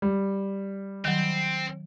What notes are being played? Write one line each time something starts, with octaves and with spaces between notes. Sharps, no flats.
G3
D#3 F#3 C4